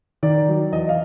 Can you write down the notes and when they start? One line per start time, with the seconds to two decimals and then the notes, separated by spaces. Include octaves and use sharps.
0.23 D#3 D5
0.48 F#3
0.72 E2 D#5
0.89 F5